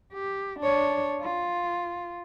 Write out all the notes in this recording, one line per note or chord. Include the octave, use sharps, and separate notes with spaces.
G4
D4 C#5
F4